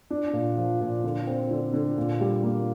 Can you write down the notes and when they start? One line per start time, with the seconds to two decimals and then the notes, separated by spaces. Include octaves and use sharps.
0.10 D4
0.33 A#2
0.58 F3
0.81 A#2
1.04 D3
1.27 C4
1.51 D3
1.74 D3
1.97 A#2
2.21 G3
2.43 A#3